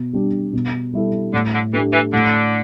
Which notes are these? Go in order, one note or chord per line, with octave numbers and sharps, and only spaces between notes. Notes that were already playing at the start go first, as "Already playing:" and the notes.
Already playing: B2
G3 D4 G4
B2
G3 E4 A4
A2 D3
D3
E3 A3 D4 G4
E3
A2 D3